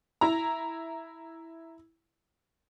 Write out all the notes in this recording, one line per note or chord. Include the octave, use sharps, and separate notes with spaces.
E4 A#5